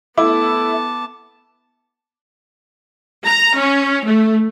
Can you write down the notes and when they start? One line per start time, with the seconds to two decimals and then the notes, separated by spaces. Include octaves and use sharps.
0.18 A3 B3 E4 A5 D6
3.25 A#5
3.56 C#4
4.04 A3